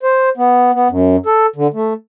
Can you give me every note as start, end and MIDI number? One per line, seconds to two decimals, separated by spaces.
0.03 0.29 72
0.37 0.71 59
0.74 0.88 59
0.90 1.16 42
1.26 1.46 69
1.56 1.67 50
1.74 1.93 57